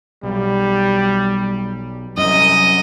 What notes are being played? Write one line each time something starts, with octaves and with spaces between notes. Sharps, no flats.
B1 G3
C2 F#2 D#5